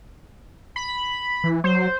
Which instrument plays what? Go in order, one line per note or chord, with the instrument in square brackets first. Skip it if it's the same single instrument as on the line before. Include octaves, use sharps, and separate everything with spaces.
[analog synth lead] B5
[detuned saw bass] E3
[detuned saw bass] F#3 [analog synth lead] C5